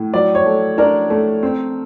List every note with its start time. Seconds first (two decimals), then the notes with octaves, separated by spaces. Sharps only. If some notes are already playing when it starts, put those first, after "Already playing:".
Already playing: A2
0.14 F#3 D5
0.35 C#5
0.46 A3
0.78 D4 A#4
1.10 A3
1.43 C4